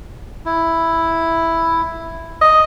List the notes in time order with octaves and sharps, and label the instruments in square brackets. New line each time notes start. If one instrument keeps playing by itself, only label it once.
[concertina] E4
[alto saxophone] D#5